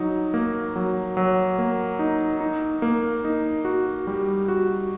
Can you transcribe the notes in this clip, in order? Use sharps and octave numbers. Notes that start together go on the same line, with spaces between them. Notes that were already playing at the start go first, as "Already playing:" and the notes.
Already playing: F#3 D#4
A#3
F#3
F#3
A#3
D#4
D#4
A#3
D#4
F#4
G3
F#4